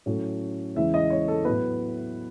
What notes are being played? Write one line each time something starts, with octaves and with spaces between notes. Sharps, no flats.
A2 F#3 A3 C#4
E2 C#3 E3 G#3 C#4 E5
D#5
C#5
A4
A2 F#3 B3 B4